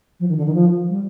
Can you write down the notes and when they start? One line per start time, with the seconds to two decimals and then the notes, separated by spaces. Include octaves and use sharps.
0.19 F3
0.28 D#3
0.37 D3
0.46 D#3
0.54 F3
0.89 G3